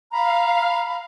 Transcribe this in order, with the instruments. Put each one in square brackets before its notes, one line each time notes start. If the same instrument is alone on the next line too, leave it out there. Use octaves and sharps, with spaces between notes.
[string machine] F5 [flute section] A#5 B5